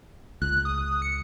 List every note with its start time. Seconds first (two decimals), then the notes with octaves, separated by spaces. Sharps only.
0.42 C#2 F#6
0.65 D#6
1.02 C#7